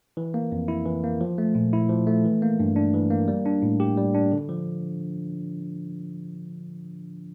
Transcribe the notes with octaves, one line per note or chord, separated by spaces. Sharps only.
E3
A#3
F2
E4
E3
A#3
F3
A3
A#2
E4
F3
A3
E3
A#3
G2
D4
E3
A#3
G3
D4
A2
G4
G3
D4
D3
F3